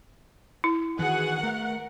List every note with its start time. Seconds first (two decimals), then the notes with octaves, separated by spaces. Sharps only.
0.64 E4
0.99 D#3 E3 B3 F#4 G#4 F#5
1.43 A3 A#4